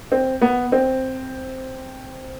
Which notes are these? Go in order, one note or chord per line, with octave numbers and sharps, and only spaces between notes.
C4
B3
C4